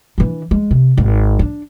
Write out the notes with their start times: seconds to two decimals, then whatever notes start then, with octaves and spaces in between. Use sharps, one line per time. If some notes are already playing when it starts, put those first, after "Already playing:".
0.18 E3 D4
0.51 G#3
0.71 C3
0.97 G#1
1.39 D4